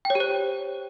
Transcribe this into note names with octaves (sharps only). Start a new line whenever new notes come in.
G5
C#5
G4
C5